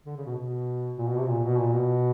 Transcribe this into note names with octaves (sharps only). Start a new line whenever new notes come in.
D3
C#3
B2
B2
A#2
B2
C3
A#2
B2
A#2
B2